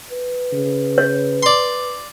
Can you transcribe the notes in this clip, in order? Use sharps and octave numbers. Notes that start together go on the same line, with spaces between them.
B4
C#3
C#5
D5 C6